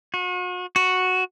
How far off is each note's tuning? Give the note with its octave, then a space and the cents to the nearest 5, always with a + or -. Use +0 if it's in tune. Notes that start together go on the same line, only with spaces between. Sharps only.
F#4 -40
F#4 -5